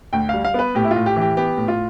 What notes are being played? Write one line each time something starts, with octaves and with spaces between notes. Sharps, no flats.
D2 G5
G3 F5
F5
B3 B4
A2 G4
E4
F4
A2
G4
E3
G4
B3 G4
A2
F4